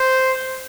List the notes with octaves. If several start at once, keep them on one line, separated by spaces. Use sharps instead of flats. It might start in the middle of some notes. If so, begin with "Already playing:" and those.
Already playing: C5